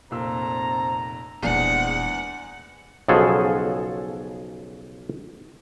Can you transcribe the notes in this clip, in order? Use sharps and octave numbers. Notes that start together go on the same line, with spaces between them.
F1 A#2 C4 A5 A#5 E6
D#1 E2 G#2 G#3 C4 D4 G#4 F#5
B1 C#3 F3 F#4 G#4 A4